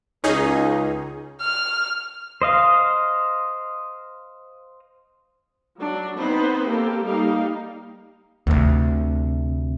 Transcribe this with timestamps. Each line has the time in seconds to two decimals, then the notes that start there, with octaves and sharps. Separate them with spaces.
0.24 C#2 C#4 D#4 G#4
1.41 F6
2.42 C5 D#5 F5
5.81 F#3 D4
6.19 B3 C4 D#4 B4 C5
6.68 A#3 G4 A4
7.06 G3 A#3 D#4 G4 F5
8.47 D2 C3